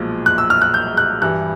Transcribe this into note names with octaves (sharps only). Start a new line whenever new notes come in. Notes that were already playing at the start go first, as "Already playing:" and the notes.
Already playing: B1 A#2 F3 G#3
F#6
E6
F6
F#6
G6
F#6
G2 E3 G3 F#6